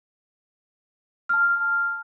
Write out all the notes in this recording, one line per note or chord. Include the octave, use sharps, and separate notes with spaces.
A5 F6